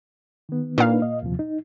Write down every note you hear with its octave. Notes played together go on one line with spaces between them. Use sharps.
D#3 B3
A#2 D4 D#4 B4 F5
D#5
D#2 C3 F3
D#4